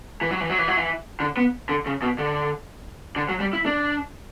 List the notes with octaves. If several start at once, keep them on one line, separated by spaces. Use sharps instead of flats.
E3
F#3
E3
F#3
E3
F#3
E3
D3
B3
D3
C#3
B2
D3
D3
F#3
G3
E4
D4